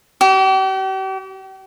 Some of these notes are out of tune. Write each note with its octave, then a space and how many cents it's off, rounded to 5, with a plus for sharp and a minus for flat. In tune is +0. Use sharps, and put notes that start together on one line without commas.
G4 -40